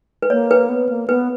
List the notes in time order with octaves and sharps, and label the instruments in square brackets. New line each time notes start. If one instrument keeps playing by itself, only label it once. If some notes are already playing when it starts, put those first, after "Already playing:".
[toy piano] B4
[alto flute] A#3 [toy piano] C#5
[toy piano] B4
[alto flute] B3
A#3
[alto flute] B3 [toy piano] B4